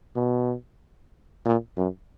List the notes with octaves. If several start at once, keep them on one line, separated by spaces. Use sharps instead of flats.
B2
A#2
F#2